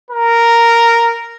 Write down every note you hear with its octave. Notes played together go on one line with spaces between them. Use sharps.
A#4